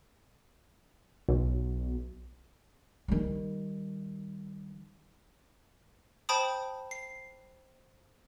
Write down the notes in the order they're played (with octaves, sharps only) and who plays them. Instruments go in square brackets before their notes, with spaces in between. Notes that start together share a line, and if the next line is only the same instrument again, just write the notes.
[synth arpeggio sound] B1
[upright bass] D#3 G3
[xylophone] C5 G5 A5 B5 D#6
C7